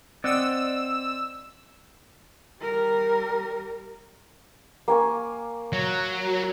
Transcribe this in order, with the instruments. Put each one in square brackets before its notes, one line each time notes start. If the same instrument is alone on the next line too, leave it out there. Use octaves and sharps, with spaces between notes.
[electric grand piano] C4 [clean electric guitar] D5 D#5 F#5 [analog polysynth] E6
[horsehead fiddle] G3 A#4
[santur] A#3 G#5 C#6
[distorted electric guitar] F#3